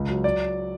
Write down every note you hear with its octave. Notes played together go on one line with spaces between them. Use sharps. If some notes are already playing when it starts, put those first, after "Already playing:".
Already playing: C#2
F#3
D5